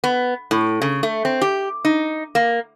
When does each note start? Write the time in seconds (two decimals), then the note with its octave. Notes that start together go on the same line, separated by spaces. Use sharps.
0.04 B3
0.51 A2
0.82 C#3
1.03 A3
1.25 C4
1.42 G4
1.85 D#4
2.35 A#3